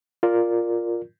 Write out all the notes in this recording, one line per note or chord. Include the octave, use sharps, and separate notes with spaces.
F4 A#4 D5